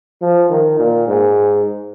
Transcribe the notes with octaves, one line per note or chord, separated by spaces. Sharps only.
F3
D#3
A#2
G#2